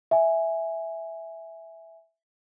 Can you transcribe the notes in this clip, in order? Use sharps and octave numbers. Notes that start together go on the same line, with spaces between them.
E5 G#5